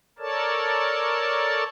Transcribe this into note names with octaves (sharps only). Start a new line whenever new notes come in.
A4 A#4 C#5 D5 A5